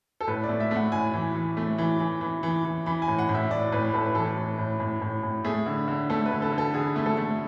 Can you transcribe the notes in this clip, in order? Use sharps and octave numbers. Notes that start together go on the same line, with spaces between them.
A4
A2 B4
D5
A3
E5
A3 F#5
A2 G#5
E3
E3
A3
E3
E3
E3
E3
E3
E3 B5
G#5
A2
F#5
A2
E5
A2 D5
A2 B4
A2 A4
B4
E3 A4
A2
A2
A2
A2
A2
A3 G#4
D3
D3
A3 A4
B4
D3
A4
D3
A4
D3 G#4
A3
A4
A3